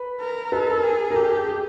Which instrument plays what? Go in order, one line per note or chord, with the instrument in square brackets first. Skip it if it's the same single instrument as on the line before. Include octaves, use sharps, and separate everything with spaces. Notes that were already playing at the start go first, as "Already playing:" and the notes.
Already playing: [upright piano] B4
[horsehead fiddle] A#4
[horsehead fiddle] A4 [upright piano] B4
[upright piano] A#4
[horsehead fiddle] G#4
[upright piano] A#4
[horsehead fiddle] G4 [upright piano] A4
[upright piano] G#4
G#4